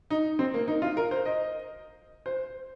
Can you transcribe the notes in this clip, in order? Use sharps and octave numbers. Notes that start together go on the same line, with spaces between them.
D#4
C4
A#3
D#4
F4
A#4
C5
D#5
C5